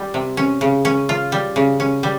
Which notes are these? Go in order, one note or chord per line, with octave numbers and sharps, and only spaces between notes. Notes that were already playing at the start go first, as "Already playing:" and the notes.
Already playing: G3
C3
C#4
C#3
C#4
F4
G3
C#3
C#4
G3